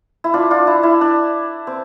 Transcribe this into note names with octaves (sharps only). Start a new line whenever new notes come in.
E4
D4 F4
D4 F4
E4
E4
D4
C4